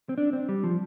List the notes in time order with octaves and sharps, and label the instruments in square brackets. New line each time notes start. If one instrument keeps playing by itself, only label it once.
[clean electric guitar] C4
D4
C4
G3
F3